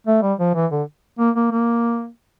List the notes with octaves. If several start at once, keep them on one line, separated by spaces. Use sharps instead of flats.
A3
G3
F3
E3
D3
A#3
A#3
A#3